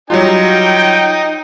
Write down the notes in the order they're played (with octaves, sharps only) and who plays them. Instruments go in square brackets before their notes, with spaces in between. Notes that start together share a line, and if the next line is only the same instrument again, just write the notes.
[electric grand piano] F#3 G3 F4 [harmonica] D#4 [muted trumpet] G5